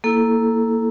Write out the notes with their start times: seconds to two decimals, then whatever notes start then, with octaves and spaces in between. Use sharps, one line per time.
0.04 A#3 E4 A4